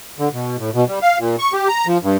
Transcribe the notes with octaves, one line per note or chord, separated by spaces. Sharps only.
D3
B2
A2
B2
G3
F5
A#2
C#6
G4
A#5
F3
G2